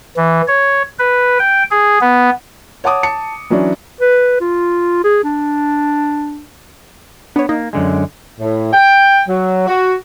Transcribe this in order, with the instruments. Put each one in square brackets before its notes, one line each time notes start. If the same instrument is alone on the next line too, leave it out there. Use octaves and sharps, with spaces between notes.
[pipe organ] E3
C#5
B4
G5
G#4
B3
[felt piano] C#5 F#5 A5 D6 D#6
A5 C#7
E3 F#3 C#4 D4
[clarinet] B4
F4
G#4
D4
[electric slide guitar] B3 [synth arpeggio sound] D4 C#5
[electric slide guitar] A#3 [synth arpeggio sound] D#4
[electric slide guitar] F#2 D3 G#3
[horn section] A2
G5
F#3
F#4